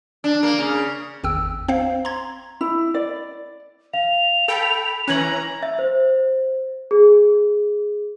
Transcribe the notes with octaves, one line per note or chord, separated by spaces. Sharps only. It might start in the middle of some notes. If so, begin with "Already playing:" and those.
D4
A#3
C#3
G#1 E2 G5 E6
C4 C5 F5
A#5 C6 G#6
E4
D5
F5 F7
A4 G5 B5
E3 C#4 A#5 F#6 G#6 F#7
E5
C5
G#4